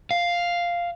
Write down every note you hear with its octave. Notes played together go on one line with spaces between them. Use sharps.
F5